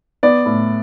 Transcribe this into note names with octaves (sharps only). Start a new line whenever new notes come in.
B3 D5
A2